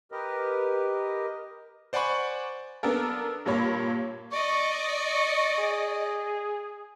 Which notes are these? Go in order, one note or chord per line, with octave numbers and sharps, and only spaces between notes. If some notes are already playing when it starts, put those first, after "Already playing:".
G4 A#4 B4 D#5
C5 D5 F#5 G#5 B5 C#6
B3 D4 A4 A#4
G2 A#2 A#3 C#5 B5
D5 D#5 C#6
G#4